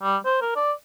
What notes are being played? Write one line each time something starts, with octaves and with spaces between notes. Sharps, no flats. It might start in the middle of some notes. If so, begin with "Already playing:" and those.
G3
C5
A#4
D5